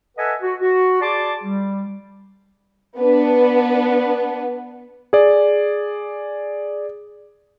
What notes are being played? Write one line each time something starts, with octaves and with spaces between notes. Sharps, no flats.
A4 B4 D#5 E5 F#5 G#5
F#4
F#4
G#4 D5 A5 C6 D6
G3
B3 D4 B4
G#4 D5